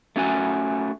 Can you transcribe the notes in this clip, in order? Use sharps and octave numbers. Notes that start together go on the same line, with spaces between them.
A3 C#4 F#4 G#5